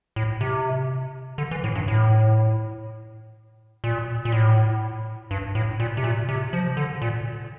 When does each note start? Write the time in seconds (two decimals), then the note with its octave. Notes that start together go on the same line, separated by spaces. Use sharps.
0.16 A2
0.41 C3
1.38 D3
1.51 E3
1.64 A2
1.75 G2
1.88 A2
3.84 A#2
4.25 A#2
4.32 A2
5.31 G2
5.55 A2
5.80 A#2
5.97 C3
6.04 A#2
6.29 C3
6.53 F3
6.77 D3
7.02 A#2